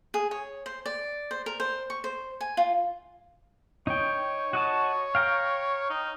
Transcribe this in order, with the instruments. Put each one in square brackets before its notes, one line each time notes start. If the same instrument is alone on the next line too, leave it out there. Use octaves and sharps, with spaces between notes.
[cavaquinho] G#4
C#5
C5
D5
C5
A#4
C5
C#6
C5
G#5
F4
[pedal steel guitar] D#4 G5 [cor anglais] C#5
[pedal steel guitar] F#4 D#5 A5
F5 G5 A#5
[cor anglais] D#4